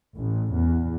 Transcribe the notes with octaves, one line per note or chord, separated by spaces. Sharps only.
A1
E2